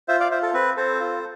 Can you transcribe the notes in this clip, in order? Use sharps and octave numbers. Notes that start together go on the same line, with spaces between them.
F4 C5 E5
D5 F5
F4 C5 E5
A4
C4 B4
C4 A4 C5
F4